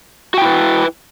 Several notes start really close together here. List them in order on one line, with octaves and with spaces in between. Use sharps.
F#4 G5 E4 B4